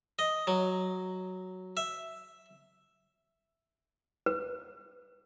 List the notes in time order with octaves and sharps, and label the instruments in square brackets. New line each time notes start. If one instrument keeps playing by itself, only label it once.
[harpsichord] D#5
F#3
E5
[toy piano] B4